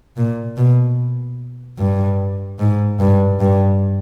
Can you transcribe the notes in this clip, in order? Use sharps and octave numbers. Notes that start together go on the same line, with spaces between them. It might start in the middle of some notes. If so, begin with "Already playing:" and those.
A#2
B2
G2
G#2
G2
G2